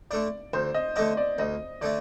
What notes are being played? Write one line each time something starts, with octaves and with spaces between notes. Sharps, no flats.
D3 A3 D4 D5
D2 C5
D#5
D3 A3 D4 D#5
D5
D2 D#5
D3 A3 D4 D5